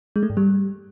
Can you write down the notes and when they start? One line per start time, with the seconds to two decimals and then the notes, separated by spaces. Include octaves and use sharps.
0.16 G#3
0.23 A3
0.30 G#2
0.37 G3